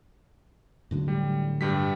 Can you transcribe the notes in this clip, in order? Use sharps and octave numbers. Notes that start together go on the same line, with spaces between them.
A2 D3 F#3
G3
G2 G3 B6